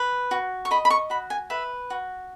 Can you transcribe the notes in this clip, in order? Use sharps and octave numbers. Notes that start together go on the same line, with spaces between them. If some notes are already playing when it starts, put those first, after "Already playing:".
Already playing: B4
F#4
C#6
D#5 B5
B5
C#6
F#4 B5
G#5
B4 E5
F#4